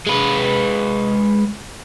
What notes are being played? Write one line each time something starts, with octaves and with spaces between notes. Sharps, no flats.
G#3 B4